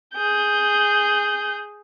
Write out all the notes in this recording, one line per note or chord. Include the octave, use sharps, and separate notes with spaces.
G#4 G6